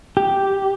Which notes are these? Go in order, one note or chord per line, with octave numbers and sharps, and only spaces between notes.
G4